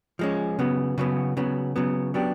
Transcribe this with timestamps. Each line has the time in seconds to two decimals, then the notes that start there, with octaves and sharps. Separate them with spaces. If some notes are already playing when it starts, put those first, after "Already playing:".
0.19 F3 G#3 C#4
0.59 C#3 F#3 B3
0.98 C#3 F#3 B3
1.37 C#3 F#3 B3
1.76 C#3 F#3 B3
2.14 F#3 B3 D4 G4